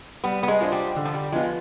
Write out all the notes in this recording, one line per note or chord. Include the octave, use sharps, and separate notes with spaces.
G3 B3
B3
G#3
D4 F4 C5 D#5
G3
D3
F3
G3
F3 G#3 B3 F4